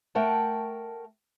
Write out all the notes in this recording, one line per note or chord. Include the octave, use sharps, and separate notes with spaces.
A3 A#4 F#5 G5 A5